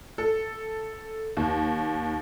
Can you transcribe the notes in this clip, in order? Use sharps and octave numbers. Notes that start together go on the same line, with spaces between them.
A4
D#2